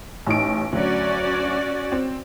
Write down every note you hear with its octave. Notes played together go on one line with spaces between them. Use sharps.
A1 D#4 D7
D2 F#3 C#4 F#4 D5
C4